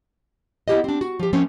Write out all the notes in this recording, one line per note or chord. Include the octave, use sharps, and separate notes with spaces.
B3 E4 F#4 G4 C5 D#5
C4 D4
F#4
F3 G4
F3 A3 A#3 C4 C#4